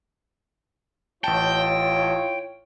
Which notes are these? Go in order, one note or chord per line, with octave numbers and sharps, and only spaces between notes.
A1 E4 F4 C#5 G5 A5